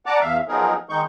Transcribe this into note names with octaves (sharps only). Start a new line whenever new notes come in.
D5 F#5 A5 A#5 D6
E2 E5 F5
F3 F#3 B3 D#4 G#4 A#4
D#3 G#3 D#4 C#6 G6